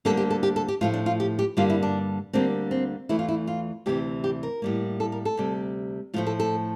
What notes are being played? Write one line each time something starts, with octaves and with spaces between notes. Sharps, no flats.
D2 D3 G3 A#3 A4
G4
A4
G4
A4
G4
A2 F3 A3 F4
D4
F4
G4
G4
G2 D3 G3 A#3 F4
E4
D4
D2 D3 G3 A#3 C4
C4
E2 E3 A3 E4
F4
E4
F4
D2 C3 E3 G4
G4
A#4
A2 G3 A#3
A4
A#4
A4
D2 C3 G3
A2 F3 A3 F4
A4
A4